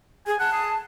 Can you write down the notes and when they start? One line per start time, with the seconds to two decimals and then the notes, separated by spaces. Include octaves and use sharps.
0.27 G#4 G#5
0.39 F#5 A5
0.53 G#4